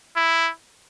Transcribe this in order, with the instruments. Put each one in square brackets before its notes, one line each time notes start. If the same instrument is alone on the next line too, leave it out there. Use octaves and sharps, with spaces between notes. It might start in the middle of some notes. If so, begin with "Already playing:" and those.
[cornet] E4